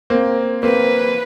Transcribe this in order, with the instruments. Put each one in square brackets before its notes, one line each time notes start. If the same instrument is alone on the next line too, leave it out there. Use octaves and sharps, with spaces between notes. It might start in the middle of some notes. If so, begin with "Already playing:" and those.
[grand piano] A#3 C4
[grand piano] A#3 C4 [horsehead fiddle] B4